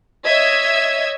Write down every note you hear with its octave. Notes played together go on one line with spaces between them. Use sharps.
C#5 D#5 E5 E6 G#6